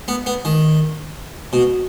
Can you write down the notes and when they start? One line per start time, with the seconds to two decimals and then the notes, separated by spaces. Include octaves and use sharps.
0.08 B3
0.26 B3
0.45 D#3
1.53 B2